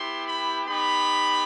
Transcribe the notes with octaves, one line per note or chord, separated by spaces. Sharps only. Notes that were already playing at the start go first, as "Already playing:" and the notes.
Already playing: B3 E4 G4 C6
B5
B3 D#4 G4 B5